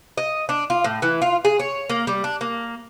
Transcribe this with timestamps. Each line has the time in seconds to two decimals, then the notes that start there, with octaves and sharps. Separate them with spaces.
0.18 D#5
0.49 D4
0.70 F4
0.84 A2
1.02 E3
1.22 F4
1.45 G#4
1.59 C#5
1.89 A#3
2.07 G3
2.24 D4
2.41 A#3